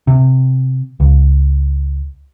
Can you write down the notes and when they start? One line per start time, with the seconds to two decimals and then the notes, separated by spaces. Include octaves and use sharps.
0.07 C3
1.00 C#2